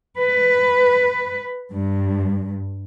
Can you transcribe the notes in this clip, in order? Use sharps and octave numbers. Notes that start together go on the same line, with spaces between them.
B4
G2